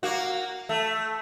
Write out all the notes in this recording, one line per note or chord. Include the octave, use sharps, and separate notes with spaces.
A#3 F#4
A3